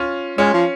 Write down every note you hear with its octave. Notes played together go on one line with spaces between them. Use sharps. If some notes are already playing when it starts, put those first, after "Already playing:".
Already playing: C#4 F4
G#3 C#4 F4
F3